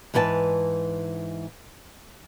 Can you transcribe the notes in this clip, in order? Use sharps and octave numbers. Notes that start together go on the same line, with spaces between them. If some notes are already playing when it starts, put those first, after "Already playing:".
G#2 E3 B4 G5 A5